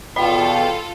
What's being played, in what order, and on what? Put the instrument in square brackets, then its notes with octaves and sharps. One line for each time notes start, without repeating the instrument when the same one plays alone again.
[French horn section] E2 B2 [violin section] F4 A4 [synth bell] D#5 B5 [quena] G5